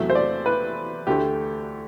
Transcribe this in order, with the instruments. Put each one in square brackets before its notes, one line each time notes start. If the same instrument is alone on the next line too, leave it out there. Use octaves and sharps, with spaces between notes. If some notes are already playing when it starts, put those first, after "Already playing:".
Already playing: [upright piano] E2 C3 F#3 A3 E5
C5
D5
B4
D2 D3 A3 G4